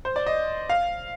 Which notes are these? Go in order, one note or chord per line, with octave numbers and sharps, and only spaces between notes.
C5
D5
D#5
F5